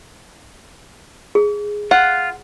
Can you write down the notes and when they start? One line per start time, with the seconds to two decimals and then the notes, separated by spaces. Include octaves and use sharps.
1.35 G#4
1.91 F4 F#5